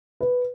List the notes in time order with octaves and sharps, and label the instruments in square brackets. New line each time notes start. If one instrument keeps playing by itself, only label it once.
[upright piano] B4